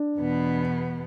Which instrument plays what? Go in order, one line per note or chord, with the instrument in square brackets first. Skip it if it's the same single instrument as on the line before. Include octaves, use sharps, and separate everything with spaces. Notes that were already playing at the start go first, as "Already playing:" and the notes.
Already playing: [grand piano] D4
[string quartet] E2 B2 B3